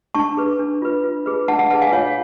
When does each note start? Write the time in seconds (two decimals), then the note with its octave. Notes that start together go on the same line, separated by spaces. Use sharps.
0.15 D4 A5 C#6
0.37 G#4 B4
0.59 D4
0.82 F4 B4
1.04 F4
1.26 G#4 B4
1.48 D4 F#5 A5
1.59 F#5 A5
1.70 B4 F#5 A5
1.74 G#4
1.82 F5 G#5
1.92 F4 C#5 F5